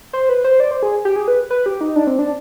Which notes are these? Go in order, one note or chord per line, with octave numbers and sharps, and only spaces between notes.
C5
B4
C5
D5
C5
G#4
G4
G#4
B4
B4
G4
D#4
D4
C4
D4